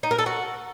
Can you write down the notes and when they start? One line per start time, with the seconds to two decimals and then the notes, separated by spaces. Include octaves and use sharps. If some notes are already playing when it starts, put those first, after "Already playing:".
0.03 D#4
0.11 A#4
0.18 A4
0.26 F#4